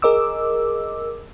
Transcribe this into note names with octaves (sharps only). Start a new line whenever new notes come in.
G#4 A#4 D#5 D6 E6